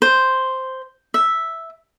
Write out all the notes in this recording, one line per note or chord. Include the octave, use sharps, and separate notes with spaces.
C5
E5